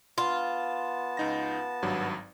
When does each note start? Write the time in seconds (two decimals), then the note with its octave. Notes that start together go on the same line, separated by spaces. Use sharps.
0.18 B3 F4 A5
1.17 C#2 D#4 A#6
1.82 G#1 G2 F#3